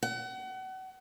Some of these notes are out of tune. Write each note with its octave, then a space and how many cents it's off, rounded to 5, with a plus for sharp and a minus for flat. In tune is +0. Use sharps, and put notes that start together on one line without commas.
F#5 +35